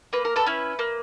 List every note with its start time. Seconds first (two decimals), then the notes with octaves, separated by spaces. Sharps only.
0.13 A#3 B4
0.25 A#4
0.36 A4 B4
0.46 C#4 E4
0.79 A#3